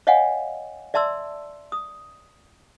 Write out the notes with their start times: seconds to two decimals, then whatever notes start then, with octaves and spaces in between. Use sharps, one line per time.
0.07 C#5 D#5 F5 F#5 G#5
0.94 D5 E5 A5 C6 E6
1.72 D#6